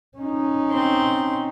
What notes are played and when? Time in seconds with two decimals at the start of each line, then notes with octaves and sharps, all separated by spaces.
0.18 C#4 D#4
0.71 C4 C6